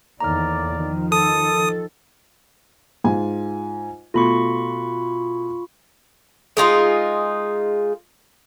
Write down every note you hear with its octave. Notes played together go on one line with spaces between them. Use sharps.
E2 A2 D#3 A#3 D5 A#5 F6
D#3 F3
A4 A5 D#6
G#2 F4 G#5
B2 A3 F4 B5 C#6
G#3 D#4 F4 G#4